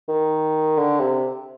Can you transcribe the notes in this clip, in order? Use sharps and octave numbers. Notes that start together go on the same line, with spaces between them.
D#3
D3
C3